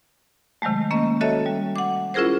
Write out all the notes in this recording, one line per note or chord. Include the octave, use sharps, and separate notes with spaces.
C3 D#3 F#3 G#3 A3
A#3 C#4 D#5
F#4 A4 C#5 D#5 E5 A5
G3
F#5 D6
C#4 E4 F4 G#4 A#4 C5